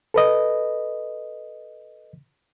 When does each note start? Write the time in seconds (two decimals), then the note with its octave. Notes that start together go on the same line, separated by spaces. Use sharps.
0.14 A4 B4 D#5